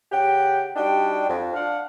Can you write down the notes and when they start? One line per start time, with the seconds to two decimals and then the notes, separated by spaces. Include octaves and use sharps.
0.12 C#3 G4 F#5 G5
0.76 G3 D4 D#4 F#4 G4 G5
1.28 F2
1.53 D4 F5 F#5